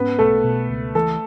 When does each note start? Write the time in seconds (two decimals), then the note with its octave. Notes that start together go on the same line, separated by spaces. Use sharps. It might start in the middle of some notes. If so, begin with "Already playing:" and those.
Already playing: G#2 B3 C#4 B4
0.18 B1 A3 A4
0.44 B2
0.69 C#2
0.95 E3 A3 A4